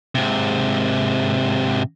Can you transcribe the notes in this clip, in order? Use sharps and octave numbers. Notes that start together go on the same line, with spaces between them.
G#2 C3